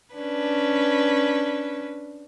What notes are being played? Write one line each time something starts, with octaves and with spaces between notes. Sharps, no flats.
C#4 D4 B4